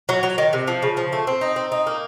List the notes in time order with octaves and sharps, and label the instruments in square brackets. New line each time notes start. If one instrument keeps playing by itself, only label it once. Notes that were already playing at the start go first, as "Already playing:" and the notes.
[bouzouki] F#3
F#3
D#3
C3
F3
C#3
F3
A3
C4
D#4
C4
D#4
A#3